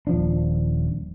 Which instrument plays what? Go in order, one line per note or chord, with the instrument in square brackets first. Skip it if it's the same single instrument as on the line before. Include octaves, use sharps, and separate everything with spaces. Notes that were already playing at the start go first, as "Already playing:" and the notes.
[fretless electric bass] D#1 F3 D4